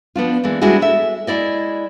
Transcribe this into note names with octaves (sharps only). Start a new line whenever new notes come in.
F3 B3 D4 F4
E3 G#3 A#3 D4
G3 G#3 D4 E4 F#4 G#4
A4 E5
G#3 E4 D5 D#5